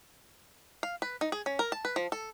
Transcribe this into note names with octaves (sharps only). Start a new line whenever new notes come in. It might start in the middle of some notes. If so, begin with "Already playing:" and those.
F5
B4
D#4
G#4
C#4
A#4
A5
B4
F3
A4